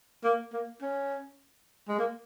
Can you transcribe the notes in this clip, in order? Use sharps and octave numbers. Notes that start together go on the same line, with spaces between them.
A#3
A#3
C#4
G#3
A#3